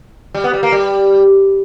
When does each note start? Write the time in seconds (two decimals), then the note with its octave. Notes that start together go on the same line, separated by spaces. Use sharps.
0.35 G3
0.44 B3
0.53 G3
0.63 A#3
0.72 G3